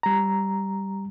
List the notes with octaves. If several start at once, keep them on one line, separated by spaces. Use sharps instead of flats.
G3 A#5